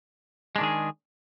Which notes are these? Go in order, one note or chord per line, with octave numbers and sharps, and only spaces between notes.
D#3 G#3 D4 G#4